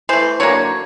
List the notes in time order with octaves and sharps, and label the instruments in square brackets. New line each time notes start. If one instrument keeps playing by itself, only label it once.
[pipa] E3 A3 C5
D3 F#3 A#3 C#5